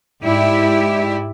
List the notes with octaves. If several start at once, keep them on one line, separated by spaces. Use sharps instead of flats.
G#2 E4 G4 D5